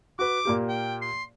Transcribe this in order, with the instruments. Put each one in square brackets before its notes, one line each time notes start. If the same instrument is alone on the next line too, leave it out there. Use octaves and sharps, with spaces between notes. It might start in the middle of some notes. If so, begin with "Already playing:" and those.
[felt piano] F#4 B4 [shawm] D6
[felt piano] A#2 A#3 G4
[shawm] G5
C6